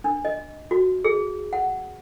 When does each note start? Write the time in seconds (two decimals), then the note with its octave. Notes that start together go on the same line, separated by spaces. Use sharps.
0.04 D4
0.25 D#5
0.71 F#4
1.04 G#4
1.53 F#5